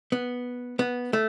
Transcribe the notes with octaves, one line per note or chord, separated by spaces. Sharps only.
B3
B3
A3